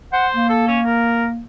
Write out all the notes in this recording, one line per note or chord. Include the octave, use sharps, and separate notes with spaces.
C5 F#5
A#3
A4
C#4
A#4